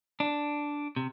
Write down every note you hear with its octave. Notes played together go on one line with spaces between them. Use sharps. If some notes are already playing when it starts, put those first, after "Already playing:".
D4
C3